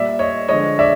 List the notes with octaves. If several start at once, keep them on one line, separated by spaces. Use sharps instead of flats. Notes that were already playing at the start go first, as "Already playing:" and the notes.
Already playing: A#2 G3 D5 E5
C#5 D#5
D3 F3 G#3 C#5 D#5
D5 E5